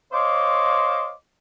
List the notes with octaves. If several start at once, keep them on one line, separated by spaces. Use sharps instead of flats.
C5 C#5 D#5 F5 C6 D6